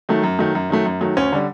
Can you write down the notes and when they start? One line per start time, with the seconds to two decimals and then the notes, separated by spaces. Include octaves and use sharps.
0.09 D#3 F#3 A3
0.23 F#2
0.39 D#3 F#3 A3
0.55 F#2
0.70 D#3 F#3 A3
0.86 F#2
1.01 D#3 F#3 A3
1.17 D2 C#4
1.32 D3 G3